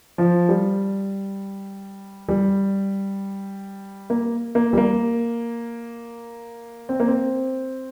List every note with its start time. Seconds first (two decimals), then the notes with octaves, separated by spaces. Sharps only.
0.18 F3
0.49 G3
2.29 G3
4.10 A#3
4.55 A#3
4.73 G3
4.78 A#3
6.89 C4
7.00 A#3
7.08 C4